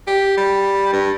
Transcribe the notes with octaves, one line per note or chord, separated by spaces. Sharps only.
G4
G3
G2